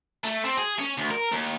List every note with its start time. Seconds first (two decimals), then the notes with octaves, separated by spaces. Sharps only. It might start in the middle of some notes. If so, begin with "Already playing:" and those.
0.24 A3
0.45 C4
0.57 G#4
0.79 C#4
0.98 D2
1.11 A#4
1.32 D#2